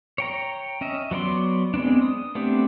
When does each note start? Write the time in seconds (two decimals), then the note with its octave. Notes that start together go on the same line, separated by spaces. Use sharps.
0.18 C#5 G5 A#5
0.81 C#4 D#5 E5
1.11 F#3 B3 D5 C6
1.74 G#3 B3 C4 D4
2.02 D#6
2.35 A3 B3 C4 D4 G4